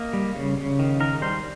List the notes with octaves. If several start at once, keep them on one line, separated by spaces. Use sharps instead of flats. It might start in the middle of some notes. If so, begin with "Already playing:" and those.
Already playing: A#3 D#5
G3
C#3
C#3
D#3
D#3 A#4
G3 C5